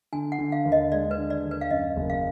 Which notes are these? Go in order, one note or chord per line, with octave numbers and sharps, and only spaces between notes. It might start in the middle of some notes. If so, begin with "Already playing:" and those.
D3 G#5
F#5
D3
F5
D#2
D#5
G#3 D5
B4
D3
D5
D#2
B4
F5
F#2 D#5
F#1
F5